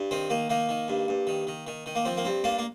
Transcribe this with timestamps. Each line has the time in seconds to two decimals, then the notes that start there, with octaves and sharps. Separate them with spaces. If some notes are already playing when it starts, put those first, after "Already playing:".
Already playing: G2
0.11 D#3 C4
0.30 D#3 A#3
0.50 D#3 A#3
0.69 D#3
0.88 G2
1.08 G2
1.27 D#3
1.47 D#3
1.67 D#3
1.86 D#3
1.95 A#3
2.05 F3 C4
2.17 A#3
2.25 G2 C4
2.44 G2 A#3 D4
2.59 A#3